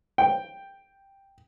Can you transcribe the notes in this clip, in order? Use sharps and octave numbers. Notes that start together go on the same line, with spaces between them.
G5